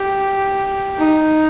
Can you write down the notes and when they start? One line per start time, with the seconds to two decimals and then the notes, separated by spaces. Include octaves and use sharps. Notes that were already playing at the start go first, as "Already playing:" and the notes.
Already playing: G4
0.97 D#4